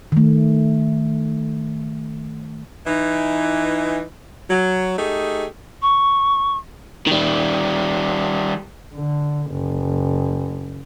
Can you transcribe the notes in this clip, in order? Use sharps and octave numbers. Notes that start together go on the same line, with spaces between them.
D#3 A3
E3 D#4
F#3
A3 D#4 G4 G#4
C#6
D#3 G3
D3
F#1